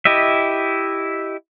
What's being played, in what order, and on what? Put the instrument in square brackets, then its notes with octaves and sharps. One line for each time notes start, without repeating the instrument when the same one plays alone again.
[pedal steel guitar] E4 G4 D#5 E5